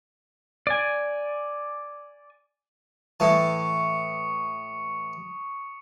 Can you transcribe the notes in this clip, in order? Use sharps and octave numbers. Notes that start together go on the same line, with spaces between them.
D5 G#5
A2 E3 A5 C#6 D#6 C#7